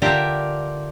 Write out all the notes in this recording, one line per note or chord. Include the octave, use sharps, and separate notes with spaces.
D3 F4 G4 A#4 E5